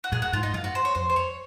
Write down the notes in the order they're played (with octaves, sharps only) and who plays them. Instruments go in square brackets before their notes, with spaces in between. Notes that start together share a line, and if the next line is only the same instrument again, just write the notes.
[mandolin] F#4
[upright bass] A#2 [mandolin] G#4
[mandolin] F#4
[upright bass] G#2 [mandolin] F4
[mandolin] D#4
[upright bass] F#2 [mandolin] F4
[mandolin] F#4
C5
C#5
[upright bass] F2 [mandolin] C5
[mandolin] C5
C#5